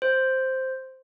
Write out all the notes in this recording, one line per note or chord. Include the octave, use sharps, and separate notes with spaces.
C5